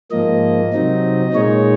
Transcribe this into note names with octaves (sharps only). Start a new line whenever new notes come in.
G#2 F3 A#3 D#5
C3 F#3 C4 D#4
A#2 G#3 D#4 C#5